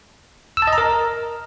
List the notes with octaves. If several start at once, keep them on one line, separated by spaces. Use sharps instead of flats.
E6
A5
D#5
A#5
A#4